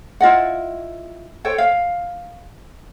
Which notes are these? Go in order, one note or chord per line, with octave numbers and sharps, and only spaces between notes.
E4 F4 D#5 F#5
A4 C5 C#5 G5
F5